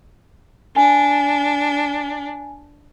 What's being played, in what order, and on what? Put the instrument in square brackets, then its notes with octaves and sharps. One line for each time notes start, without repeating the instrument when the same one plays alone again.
[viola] D4 [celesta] G#5